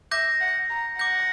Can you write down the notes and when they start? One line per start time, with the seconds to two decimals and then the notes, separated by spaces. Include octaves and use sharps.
0.11 E5 D6 G6 A#6
0.41 F#5
0.70 A#5
0.99 F#5 D6 G6 A#6